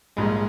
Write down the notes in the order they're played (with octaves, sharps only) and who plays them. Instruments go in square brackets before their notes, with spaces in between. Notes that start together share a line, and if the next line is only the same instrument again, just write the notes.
[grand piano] A#1 G#2 G3 A#3 [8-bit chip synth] G#3